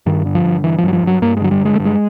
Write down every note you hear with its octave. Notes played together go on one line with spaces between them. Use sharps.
G2 D#3
D3
F3
G2
G2 E3
F3
G2 F#3
F3
G2 F#3
G2 A#3
G#3
D3 F#3
G3
G2 G#3
A3
G2
G#3